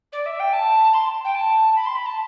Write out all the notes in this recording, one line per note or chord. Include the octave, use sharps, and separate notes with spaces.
D5
E5
G5
A5
C6
G5
A5
B5
C6
B5
A5